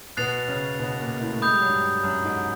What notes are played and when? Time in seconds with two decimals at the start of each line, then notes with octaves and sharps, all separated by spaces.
0.17 B2 B3 F#6 A6 C7 F7
0.48 C#3 C#4
0.79 B2 B3
0.95 B3
1.00 A#2 A#3
1.20 A2 A3
1.41 G#3 B5 D#6 G6
1.50 G3
1.60 F#3
1.69 G2 G3
2.03 F#2 F#3
2.24 G#2 G#3